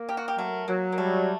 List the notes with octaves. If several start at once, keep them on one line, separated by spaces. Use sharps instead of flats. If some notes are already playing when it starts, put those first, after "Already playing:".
Already playing: A#3
G4 A#4
F#4
G4
F#3 A3
F#3 A#3
A#3
G3 A3